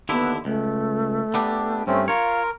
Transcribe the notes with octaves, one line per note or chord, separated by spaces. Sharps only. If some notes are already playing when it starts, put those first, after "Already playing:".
D#2 D3 B3 E4
C#2 A3
B3 D4 G4
G2 A3 C4 C#4 E5
F4 A#4 C#5 F5